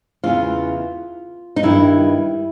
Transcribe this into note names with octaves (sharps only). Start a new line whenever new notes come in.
E2 C#3 E3 F4
D#4
G2 D#3 E4